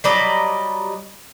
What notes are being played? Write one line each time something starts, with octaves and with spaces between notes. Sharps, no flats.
F#3 G3 D5 D#5